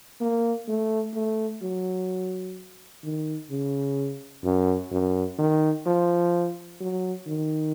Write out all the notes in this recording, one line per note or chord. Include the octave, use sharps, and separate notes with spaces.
A#3
A3
A3
F#3
D#3
C#3
F#2
F#2
D#3
F3
F#3
D#3